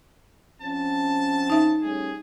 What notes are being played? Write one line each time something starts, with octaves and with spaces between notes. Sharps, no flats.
F3 C4 C#4 A5
D#4 E5
G3 A3 C#4 G#4